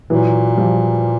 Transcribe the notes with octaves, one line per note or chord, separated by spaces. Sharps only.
A#2 E3 F#3
F3 G3